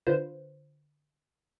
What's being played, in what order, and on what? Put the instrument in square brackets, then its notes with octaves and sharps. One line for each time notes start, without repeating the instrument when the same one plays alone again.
[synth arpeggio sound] D3 F4 B4 C5